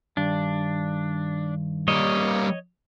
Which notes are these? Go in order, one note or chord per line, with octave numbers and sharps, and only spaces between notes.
G2 D#3 D4
G3 A#3 C#5 D#5